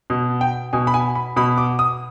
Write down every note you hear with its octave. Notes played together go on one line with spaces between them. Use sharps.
B2
G5
B2 G#5
B5
G#5
B5
B2 B5
D6
D#6